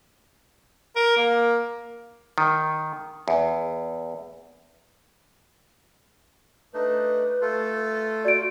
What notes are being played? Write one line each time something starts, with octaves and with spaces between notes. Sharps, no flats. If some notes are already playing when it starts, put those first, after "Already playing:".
A#4
A#3
D#3
E2
A3 D4 D#4 B4
A3 F4 A4
F#4 D5 D7